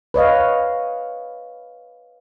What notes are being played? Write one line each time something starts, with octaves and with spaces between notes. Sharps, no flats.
B4 C#5 D#5 F5